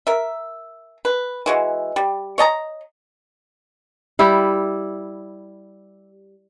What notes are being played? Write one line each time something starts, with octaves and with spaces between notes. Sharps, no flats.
A#4 E5
B4
E3 G#3 F#4
G3
C#5 D#5 A5 A#5
G3 E4 G4